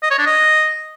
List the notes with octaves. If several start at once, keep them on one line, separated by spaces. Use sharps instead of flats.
D#5
C#5
D4
D#5